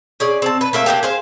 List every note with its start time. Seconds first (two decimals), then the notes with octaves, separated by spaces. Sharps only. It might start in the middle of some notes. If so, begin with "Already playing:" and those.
0.20 C#4 G#4 D5
0.42 C4 A5
0.61 B4
0.73 A3 A#3 E5 F5
0.86 A#3 B3 D4 G4
1.03 G#4 C5 F5